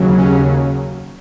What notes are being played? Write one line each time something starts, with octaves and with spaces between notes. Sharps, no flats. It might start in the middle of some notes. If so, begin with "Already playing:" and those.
Already playing: D#2 C#3 F#3
C#4